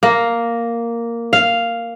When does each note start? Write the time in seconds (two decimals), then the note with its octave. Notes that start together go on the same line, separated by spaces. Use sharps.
0.03 A#3
1.33 F5